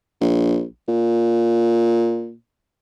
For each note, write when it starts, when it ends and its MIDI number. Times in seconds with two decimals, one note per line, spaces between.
0.21 0.64 34
0.88 2.34 46